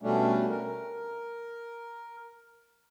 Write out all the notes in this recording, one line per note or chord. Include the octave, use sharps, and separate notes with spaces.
B2 G3 A3 C#4 D4
A#4